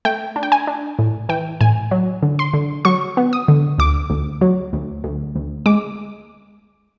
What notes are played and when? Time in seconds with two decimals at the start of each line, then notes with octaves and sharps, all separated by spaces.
0.05 A3 G5
0.36 D4
0.43 G5
0.52 G#5
0.67 D4
0.99 A2
1.29 E3 G5
1.61 A2 G#5
1.91 F#3
2.22 D3
2.39 C6
2.54 D3
2.85 F#3 C#6
3.17 B3
3.33 D#6
3.48 D3
3.78 D2 D6
4.10 D2
4.41 F#3
4.73 D2
5.04 D2
5.36 D2
5.66 G#3 D6